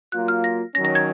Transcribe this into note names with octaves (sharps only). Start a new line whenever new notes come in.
F#3 A#3 F4 F#6
F6
A#6
D#3 F#3 C#4 A#6
A#6
G#6